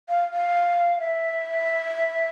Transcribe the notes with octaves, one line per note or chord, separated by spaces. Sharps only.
F5
F5
E5